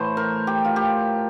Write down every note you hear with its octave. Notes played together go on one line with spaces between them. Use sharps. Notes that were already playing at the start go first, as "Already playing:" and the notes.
Already playing: A2 E3 A3 C5
A#4
G4
F4
G4